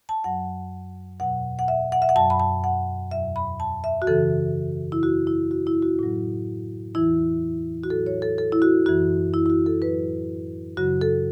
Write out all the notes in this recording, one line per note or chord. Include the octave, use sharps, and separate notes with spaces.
A5
F#2 F#3 F#5
E2 B2 F#3 F#5
F#5
E5
F#5
E5
F#5
F#2 F#3 A5
B5
A5
F#5
E2 B2 F#3 E5
B5
A5
E5
F#4
F#2 C#3 E3 A4
E4
F#2 C#3 E3 F#4
E4
F#4
E4
F#4
A2 F#3
E2 E3 E4
F#4
A2 F#3 A4
C#5
A4
A4
E4
F#4
F#2 E3 F#4
E4
E4
F#4
A4
A2 F#3 B4
F#2 C#3 F#3 F#4
A4